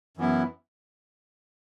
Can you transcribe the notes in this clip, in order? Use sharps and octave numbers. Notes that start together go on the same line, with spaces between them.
F#2 E3 B3 E4